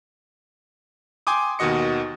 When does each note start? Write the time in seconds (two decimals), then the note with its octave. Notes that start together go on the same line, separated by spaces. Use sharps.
1.27 G5 G#5 C6 D6 D#6
1.59 D#2 B2 D#3 F#4 D#5 C#7